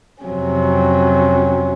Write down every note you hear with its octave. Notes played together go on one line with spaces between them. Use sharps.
F2 C3 F#3 C#4